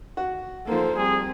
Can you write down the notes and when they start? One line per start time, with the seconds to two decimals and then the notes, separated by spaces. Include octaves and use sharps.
0.17 F#4
0.67 F3 A#3 A4 C5
0.97 G3 C4 G#4